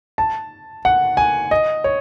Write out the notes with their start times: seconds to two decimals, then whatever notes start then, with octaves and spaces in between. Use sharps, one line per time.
0.18 A5
0.85 F#5
1.17 G#5
1.51 D#5
1.84 C#5